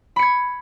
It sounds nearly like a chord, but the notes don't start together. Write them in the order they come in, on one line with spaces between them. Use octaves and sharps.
B5 C#7 G#6